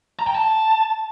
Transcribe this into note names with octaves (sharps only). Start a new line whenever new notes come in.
A#5
G5
A5